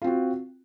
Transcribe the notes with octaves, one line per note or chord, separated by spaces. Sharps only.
C4 F4 F#4